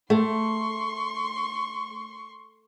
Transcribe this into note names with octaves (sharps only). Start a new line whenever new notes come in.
A3 C6 C#6